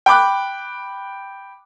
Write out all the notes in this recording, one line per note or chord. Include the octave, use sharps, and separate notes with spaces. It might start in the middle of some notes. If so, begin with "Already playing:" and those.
G5 B5 D6 F#6